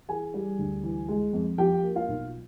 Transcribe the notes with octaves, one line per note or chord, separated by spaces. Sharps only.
E3 G#4 G#5
G3
D2
E3
G#3
F2
F3 G4 G5
A#3
F4 F5
B1